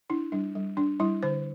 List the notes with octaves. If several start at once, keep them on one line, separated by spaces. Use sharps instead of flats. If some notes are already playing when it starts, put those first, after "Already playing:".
D4 E4
G3 D4
G3
D4
G3 E4
D3 C5